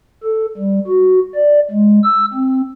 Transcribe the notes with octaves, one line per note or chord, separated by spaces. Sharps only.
A4
G3
F#4
D5
G#3
E6
C4